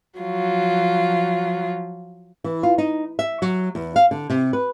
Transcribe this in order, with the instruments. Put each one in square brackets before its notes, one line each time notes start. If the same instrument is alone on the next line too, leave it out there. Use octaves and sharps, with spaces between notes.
[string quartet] F3 F#3 F4
[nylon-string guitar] E3
F4
D#4
E5
F#3
E2
F5
D3
C3
B4